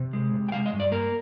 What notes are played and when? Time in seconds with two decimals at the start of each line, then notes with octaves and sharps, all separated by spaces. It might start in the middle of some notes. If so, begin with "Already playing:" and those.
Already playing: C3
0.13 G#3
0.34 C3
0.49 G5
0.52 G#3 F5
0.66 D#5
0.73 G2
0.80 D5
0.92 A#3 A#4